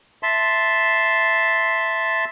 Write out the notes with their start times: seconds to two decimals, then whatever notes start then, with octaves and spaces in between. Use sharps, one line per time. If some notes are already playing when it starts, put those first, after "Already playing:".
0.23 E5 A5 C6